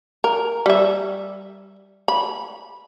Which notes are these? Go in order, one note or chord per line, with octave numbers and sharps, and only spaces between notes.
A#4
G3 E5
B5